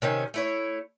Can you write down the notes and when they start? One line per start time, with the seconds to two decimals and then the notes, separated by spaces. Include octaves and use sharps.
0.02 C3 D#3 C#4
0.34 A3 E4 C#5